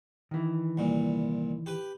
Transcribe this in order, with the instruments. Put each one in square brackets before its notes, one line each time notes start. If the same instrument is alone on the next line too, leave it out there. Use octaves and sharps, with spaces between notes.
[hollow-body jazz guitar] D#3 E3
[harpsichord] C2 A#2
G4 B4